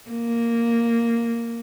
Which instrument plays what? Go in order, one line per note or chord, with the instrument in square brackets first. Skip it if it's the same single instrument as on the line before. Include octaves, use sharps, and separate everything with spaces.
[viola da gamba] A#3